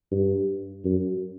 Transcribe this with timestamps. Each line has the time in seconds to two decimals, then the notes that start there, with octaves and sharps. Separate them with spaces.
0.11 G2
0.85 F#2